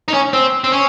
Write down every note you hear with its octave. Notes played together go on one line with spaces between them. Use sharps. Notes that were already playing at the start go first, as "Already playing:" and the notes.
D#4
C#4
C4
C4
C#4